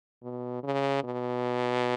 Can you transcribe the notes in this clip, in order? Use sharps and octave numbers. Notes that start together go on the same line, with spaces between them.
B2
C#3
B2